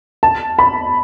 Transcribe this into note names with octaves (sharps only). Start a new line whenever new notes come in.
A5
B5